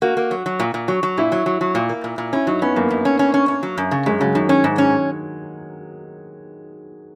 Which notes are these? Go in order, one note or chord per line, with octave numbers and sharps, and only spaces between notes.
A#3 F#4
A#3
F#3
F#3
A#2
A#2
F#3
F#3
A#2 E4
F#3
F#3
F#3
A#2
A#3
A#2
A#2
C#4 E4
F#3 D#4
B3 C#4
F#2 A#3
F#2
C#4
C#4
C#4
C#4
F#3
F#2
C#3
F#2 G#3
C#3 F#3
F#2 D#3
D#3 C#4
G#2
C#4